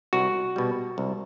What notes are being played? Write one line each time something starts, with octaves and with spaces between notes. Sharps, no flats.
C2 F#4
B2 G3
C2